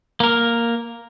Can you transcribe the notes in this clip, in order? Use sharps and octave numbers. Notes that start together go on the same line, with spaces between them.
A#3 A#4